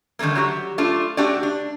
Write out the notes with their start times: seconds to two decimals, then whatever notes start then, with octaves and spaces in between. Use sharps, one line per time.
0.19 D3 D#3 G3 A3 A#3
0.35 F#3 F#4 G4
0.78 A3 D4 F4
1.17 A3 D4 F#4 G4 D5
1.43 D4